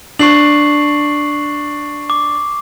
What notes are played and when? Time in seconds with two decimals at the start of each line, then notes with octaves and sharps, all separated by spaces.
0.19 D4 C#6 C7 F#7
2.10 D6